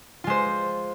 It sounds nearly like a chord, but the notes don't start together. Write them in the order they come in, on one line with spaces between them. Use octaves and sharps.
F4 G#3 C5